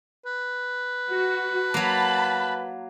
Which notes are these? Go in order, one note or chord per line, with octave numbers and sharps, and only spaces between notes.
B4
F#4
F#3 A#3 A5 B5